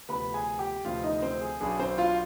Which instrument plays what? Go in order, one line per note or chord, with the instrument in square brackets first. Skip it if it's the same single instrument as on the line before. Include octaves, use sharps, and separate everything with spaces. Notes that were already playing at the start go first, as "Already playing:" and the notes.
[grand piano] D2 C3 F3 B3 B4 B5
G#4 G#5
G4 G5
D2 C3 F3 B3 F4 F5
D#4 D#5
C4 C5
G#4
B1 B2 B3 D4 G#4
C4 C5
F4 F5